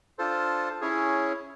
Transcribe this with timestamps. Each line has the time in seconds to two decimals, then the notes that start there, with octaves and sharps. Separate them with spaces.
0.18 D4 F4 A4 C5
0.81 C#4 E4 G#4 C#5